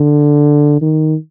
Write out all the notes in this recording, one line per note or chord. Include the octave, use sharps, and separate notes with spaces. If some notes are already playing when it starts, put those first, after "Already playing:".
Already playing: D3
D#3